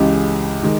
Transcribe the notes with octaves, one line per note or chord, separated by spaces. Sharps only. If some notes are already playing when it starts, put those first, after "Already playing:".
Already playing: C#2 C#3 E3 G#3 G4
D#3 G#3